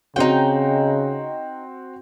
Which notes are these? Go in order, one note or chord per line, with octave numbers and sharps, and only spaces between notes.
C#3 C4 D#4 F#4 G5